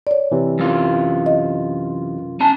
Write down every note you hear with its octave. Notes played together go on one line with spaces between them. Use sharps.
C#5 D5
C3 E3
F#2 F4
D#5
C#4 G#5 A5